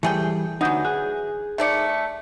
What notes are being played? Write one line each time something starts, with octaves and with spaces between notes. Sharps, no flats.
E3 G3 A3 G#4 G5
D2 E3 F#3 D4 D#4 F#5 D#6 G6
G#4 F#6
D#3 A3 D5 E5 C#7